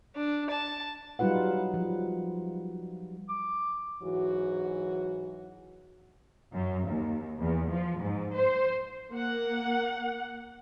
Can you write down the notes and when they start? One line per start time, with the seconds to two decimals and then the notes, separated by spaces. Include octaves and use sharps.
0.15 D4
0.49 A5
1.19 F#3 G3 D#4 F4 B4 F#5
1.74 F3
3.29 D6
4.03 G#2 E3 F#3 F#4
6.54 F#2
6.89 D#2
7.40 E2
7.71 F3
8.00 G#2
8.35 C5
9.12 A#3 F#5